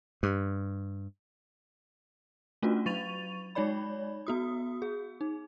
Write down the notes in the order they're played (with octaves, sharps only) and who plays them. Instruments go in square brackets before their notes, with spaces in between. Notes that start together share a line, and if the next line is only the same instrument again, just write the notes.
[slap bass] G2
[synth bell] A3 C#4 D4 F4 F#4
F#3 C#6 A6 D#7 F7
G#3 D#4 C#5 D5 B5
B3 F#4 D#6
G#4
D#4